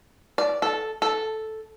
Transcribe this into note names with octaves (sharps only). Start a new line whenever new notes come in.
D5
A4
A4